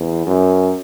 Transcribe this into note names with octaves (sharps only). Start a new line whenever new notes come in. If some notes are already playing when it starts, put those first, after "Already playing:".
Already playing: E2
F#2